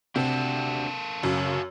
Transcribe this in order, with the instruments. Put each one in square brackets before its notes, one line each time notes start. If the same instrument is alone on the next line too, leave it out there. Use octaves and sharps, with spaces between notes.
[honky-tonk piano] C3 [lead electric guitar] A#3 A4 [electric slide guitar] D4 F#4
[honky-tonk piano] F#2 [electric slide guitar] C#3